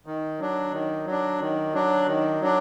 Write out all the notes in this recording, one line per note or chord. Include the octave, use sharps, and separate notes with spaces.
D#3
F#3 D4
D#3
F#3 D4
D#3
F#3 D4
D#3
F#3 D4